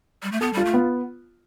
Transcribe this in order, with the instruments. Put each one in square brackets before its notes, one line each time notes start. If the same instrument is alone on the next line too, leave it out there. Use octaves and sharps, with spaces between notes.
[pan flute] G3
A3
[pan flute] B3 [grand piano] A4
[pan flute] G3 [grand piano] F4
[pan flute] A3
[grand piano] B3